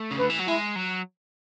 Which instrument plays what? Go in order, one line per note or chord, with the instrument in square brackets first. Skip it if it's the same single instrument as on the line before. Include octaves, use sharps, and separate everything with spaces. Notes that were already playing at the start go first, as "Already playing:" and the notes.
Already playing: [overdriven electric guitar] A3
C#3
[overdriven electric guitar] D3 [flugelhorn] B4
[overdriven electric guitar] E3
F#3
[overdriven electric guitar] G#3 [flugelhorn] E4
[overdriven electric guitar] F#3